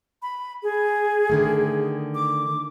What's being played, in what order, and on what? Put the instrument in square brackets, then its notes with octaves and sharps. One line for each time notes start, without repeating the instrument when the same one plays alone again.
[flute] B5
G#4
[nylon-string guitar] D3 D#3 A3
[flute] D6